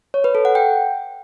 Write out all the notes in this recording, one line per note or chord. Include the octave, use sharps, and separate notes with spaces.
C#5
B4
A4
F#5
G5